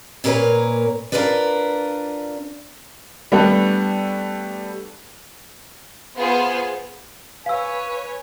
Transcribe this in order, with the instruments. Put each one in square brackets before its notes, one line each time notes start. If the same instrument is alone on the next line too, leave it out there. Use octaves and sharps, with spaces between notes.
[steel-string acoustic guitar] A#2 A#3 A#4 B4 C#5
D4 F4 A#4 B4 D5
[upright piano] G3 A3 B3 D4
[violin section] B3 F4 G#4 C5
[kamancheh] B4 C#5 [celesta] F5 E6 [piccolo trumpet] G#5